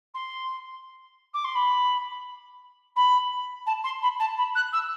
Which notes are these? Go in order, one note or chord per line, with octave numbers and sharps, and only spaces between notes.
C6
D6
C6
B5
B5
A5
C6
B5
A5
B5
F#6
E6